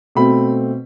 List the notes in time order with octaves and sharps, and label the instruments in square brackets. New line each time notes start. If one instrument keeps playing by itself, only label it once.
[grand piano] B2 A3 C4 B5